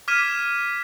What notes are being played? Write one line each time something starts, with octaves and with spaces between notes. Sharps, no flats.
D6 F6 G#6 B6 D#7 E7